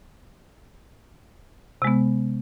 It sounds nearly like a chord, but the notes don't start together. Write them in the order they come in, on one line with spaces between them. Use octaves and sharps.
C3 G#3 B3